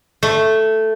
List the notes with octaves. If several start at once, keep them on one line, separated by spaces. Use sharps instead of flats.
A3